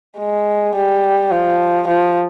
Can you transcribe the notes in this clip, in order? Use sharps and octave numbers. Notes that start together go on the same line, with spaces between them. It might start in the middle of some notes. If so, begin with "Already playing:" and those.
G#3
G3
F3
F3